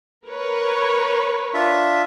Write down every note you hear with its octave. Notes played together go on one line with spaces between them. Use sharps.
A#4 B4 C#5
D4 F4 E5